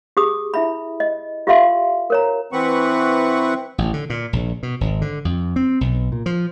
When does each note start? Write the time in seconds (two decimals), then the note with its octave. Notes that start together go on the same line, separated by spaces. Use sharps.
0.17 G4 G#4 D#6
0.54 E4 E5 B5
1.00 D#5
1.47 F4 G4 A4 E5 F5 C6
2.10 A#4 C#5 A#5
2.53 E3 C4 B4 F#5 C#6
3.78 A1
3.93 D3
4.10 A#2
4.33 A#1
4.63 B2
4.81 G#1
5.01 D3
5.25 F2
5.56 C4
5.81 B1
6.12 A#2
6.26 F3